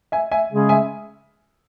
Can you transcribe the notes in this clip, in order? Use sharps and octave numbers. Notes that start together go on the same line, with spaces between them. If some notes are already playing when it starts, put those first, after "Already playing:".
E5 G#5
E5 G#5
C#3 G#3 C#4 G#4
E5 G#5